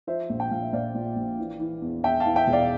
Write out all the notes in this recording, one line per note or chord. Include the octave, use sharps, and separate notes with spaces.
F3 C5 E5
A#1
G5
A#1 F5
E5
A#1 D5 F5
A#2
A#1
E3
E3
E2
E2 E5 G5
F5 A5
E3
E5 G5
E1
D5 F5